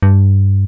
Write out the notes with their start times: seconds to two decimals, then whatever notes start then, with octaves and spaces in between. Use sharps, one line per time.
0.02 G2